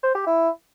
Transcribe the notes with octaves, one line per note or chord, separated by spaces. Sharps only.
C5
G4
E4